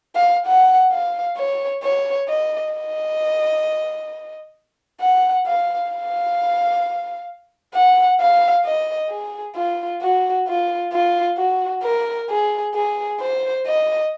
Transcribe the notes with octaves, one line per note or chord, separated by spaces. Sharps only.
F5
F#5
F5
C#5
C#5
D#5
D#5
F#5
F5
F5
F#5
F5
D#5
G#4
F4
F#4
F4
F4
F#4
A#4
G#4
G#4
C5
D#5